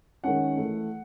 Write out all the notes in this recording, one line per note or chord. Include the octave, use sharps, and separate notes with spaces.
D#3 G#3 C#4 F#5
E3 A3 E4